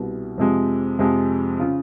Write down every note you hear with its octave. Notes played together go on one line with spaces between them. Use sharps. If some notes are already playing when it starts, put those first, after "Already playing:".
Already playing: C2 B2 G3
F2 C3 F3 G#3
F2 C3 F3 G#3
C#3 F4